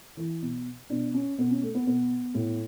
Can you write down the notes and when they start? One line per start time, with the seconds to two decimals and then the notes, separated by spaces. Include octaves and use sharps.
0.17 E3
0.42 B2
0.90 B2 D4
1.14 C#4
1.38 B2 B3
1.51 C#4
1.62 A3
1.74 B3
1.86 B2 B3
2.35 A2